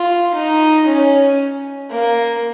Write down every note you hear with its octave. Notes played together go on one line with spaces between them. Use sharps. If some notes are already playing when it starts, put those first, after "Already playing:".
Already playing: F4
D#4
C#4
A#3